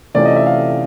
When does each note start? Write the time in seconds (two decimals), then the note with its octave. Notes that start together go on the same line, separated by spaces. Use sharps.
0.14 C3 E3 A3 C#4 F4 D5
0.25 D#5
0.36 E5
0.47 F5